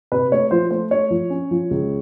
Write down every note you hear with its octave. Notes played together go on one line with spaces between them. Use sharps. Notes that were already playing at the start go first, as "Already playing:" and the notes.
C3 B4
A3 C#5
F3 C5
A3 C5
A3 C#5
F3
C#4
F3
C#2